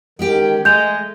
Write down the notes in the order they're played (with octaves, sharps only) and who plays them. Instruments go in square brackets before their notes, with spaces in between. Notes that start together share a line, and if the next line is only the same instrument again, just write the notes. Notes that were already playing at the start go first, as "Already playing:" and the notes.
[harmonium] D#3 [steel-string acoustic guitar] G#3 C#4 G4
[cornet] G#3 [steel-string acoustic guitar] A3 [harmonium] D#5 [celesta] G6 F7